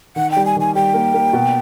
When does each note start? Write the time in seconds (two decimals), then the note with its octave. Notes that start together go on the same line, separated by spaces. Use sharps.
0.16 D#3 F#5
0.31 G5
0.36 G3
0.46 G#5
0.56 D#3 G#5
0.75 G3 G5
0.94 A#3
1.14 A#3
1.33 B2